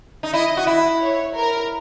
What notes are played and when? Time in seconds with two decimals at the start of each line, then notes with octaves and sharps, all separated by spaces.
0.23 D#4
0.33 E4 D#5
0.57 F#4
0.67 E4
1.01 C#5
1.36 A#4